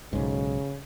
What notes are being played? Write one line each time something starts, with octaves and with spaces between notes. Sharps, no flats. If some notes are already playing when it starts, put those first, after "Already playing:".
B1 G#2 C#3